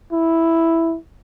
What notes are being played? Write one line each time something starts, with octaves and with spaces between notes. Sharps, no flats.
E4